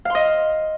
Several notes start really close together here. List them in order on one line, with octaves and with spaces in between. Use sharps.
F5 C6 D#5